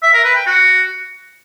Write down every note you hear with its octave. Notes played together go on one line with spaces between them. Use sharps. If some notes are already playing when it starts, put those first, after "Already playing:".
E5
A#4
B4
G5
F#4